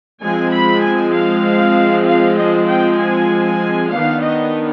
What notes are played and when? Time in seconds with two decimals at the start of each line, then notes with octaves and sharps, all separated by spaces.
0.23 F3 G#3 C4 G#5
0.54 B5
0.84 G#5
1.15 F5
2.08 F5
2.38 D#5
2.69 G5
3.00 G#5
3.46 G#5
3.92 D#3 B3 D4 F5
4.23 D#5